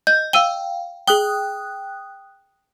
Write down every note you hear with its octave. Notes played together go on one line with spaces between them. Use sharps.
D#5 G6
F5 G5 E6 D#7 G7
G#4 G5 D#6 F#6 G7